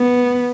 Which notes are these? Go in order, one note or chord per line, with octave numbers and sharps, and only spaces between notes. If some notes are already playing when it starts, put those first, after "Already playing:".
Already playing: B3